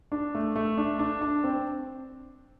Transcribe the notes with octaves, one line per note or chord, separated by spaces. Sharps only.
D4
A3
A3
D4
D4
D4
C4